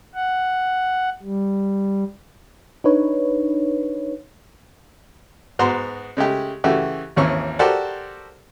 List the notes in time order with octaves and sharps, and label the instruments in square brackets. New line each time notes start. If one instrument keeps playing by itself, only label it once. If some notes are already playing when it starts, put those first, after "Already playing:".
[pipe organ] F#5
G3
[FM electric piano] D4 D#4 B4 C#5
[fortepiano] G#2 B3 F#4 A#5 C6
C#3 G#3 A3 G4
C#3 E3 A3 F#4 G4
G#1 D#2 E3 C#4 C#6
F#4 G4 A4 A#4 C5 D5